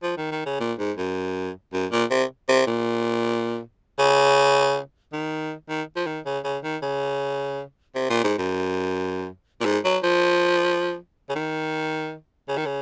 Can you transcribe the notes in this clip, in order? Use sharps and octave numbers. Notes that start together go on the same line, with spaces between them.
F3
D#3
D#3
C#3
A#2
G#2
F#2
F#2
A#2
C3
C3
A#2
C#3
D#3
D#3
F3
D#3
C#3
C#3
D#3
C#3
C3
A#2
G#2
F#2
A#2
G#2
F#3
F3
C#3
D#3
C#3
D#3
C#3